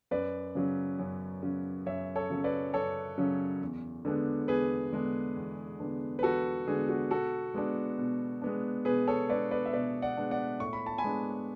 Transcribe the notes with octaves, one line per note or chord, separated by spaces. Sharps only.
F#2 B4 D5
C#3 F#3 C#4
F#2
C#3 F#3 C#4
F#2 C#5 E5
A4 C#5
C#3 F#3 C#4
B4 D5
F#2 A4 C#5
C#3 F#3 C#4
E2
D3 G#3 B3 D4
E2 G#4 B4
D3 G#3 B3 D4
E2
D3 G#3 B3 D4
B4
E2 F#4 A4
D3 G#3 B3 D4 G#4
F#4
B2 F#4 A4
G#3 B3 D4
B2
G#3 B3 D4
B2 G#4 B4
A4 C#5
G#3 B3 D4 B4 D5
B4 D5
E5
B2 B4 D5
D5 F#5
G#3 B3 D4
D5 F#5
A2 C#6
B5
A5
G#5 B5
G#3 B3 D4